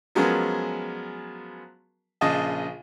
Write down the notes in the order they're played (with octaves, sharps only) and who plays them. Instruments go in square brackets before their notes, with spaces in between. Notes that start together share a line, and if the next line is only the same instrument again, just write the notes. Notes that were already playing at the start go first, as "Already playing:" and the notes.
[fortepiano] F3 F#3 G#3 B3 C#4 A#4
A#1 C#3 D#5 A5